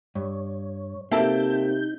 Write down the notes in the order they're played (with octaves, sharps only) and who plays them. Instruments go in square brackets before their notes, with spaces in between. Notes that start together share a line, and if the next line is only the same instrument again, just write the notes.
[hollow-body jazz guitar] G2 [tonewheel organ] C#5
[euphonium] C3 [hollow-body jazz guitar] A#3 C4 A4 [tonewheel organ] D#4 G6 [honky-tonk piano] E5 A5